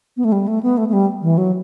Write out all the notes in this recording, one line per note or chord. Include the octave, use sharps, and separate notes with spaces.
B3
A3
G3
A3
B3
A3
A3
G3
E3
F#3